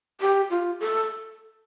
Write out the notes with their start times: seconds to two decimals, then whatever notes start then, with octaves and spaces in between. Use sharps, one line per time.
0.21 G4
0.50 F4
0.80 A4